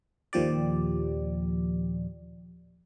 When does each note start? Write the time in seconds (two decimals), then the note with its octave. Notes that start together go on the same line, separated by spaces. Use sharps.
0.33 D#2 A#2 F3 G4 D5